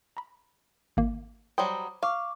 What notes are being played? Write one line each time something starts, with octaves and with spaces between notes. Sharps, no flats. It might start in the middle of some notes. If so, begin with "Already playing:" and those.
A#5 B5
G#1 A#3
F#3 G3 C5 G5 D#6
F5 C#6 D6